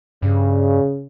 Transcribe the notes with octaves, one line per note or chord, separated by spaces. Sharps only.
G2 C#3